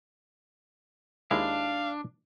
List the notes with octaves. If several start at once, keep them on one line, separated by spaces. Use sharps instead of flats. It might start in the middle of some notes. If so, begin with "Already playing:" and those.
D#2 G#3 D4 E4 F5